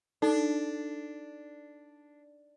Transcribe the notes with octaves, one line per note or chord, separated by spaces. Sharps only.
D4 D#4 A4